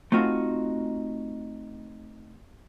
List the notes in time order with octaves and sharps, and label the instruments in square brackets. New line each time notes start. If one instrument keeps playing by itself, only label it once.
[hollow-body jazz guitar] A3 C4 D#4 F4 F#4